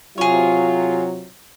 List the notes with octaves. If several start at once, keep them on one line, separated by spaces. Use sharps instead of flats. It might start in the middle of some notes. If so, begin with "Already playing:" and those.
C3 F#3 F4 G#4 C#5